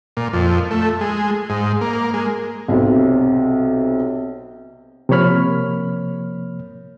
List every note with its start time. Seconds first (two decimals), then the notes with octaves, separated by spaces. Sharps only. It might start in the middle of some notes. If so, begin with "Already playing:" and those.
0.17 A#2
0.33 F2
0.71 A3
1.01 G#3
1.50 G#2
1.81 A#3
2.14 G#3
2.68 B1 C3
5.09 C3 F3 A#3 C#5 B5 F6